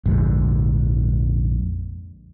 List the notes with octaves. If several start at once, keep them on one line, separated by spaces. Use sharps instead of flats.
A#1 F2 G#2 D3